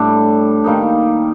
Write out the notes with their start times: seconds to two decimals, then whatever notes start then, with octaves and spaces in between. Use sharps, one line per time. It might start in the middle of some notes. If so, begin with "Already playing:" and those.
Already playing: A2 G3 D4 G4
0.64 D#3 G3 A#3 D#4